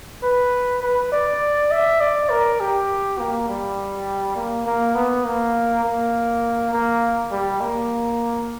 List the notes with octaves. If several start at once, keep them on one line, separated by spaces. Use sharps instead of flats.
B4
B4
D5
E5
D5
A#4
G4
A#3
G3
A#3
A#3
B3
A#3
A#3
A#3
G3
A#3